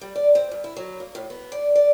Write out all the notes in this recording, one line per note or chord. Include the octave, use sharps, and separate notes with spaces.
G3
D5
C4
G2
E4
F#3
A#3
A2
B3
D5
D5